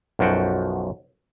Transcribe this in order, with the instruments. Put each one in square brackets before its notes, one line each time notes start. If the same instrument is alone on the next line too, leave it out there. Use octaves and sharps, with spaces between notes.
[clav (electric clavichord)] B1 F#2 F3 F#4 G5